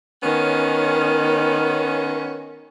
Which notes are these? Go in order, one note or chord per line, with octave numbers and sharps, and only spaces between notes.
D#3 B3 C#4